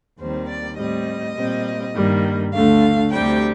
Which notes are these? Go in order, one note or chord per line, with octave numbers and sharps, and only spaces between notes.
D#2 D#3 G3 C4 C5
D5
A2 G3 C4 D#5
A#2 G3 C4
G2 D#3 G3 A#3
D2 D3 A3 F5
D2 C3 G3 G5